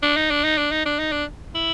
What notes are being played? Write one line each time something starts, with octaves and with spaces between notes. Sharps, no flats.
D4
D#4
D4
D#4
D4
D#4
D4
D#4
D4
E4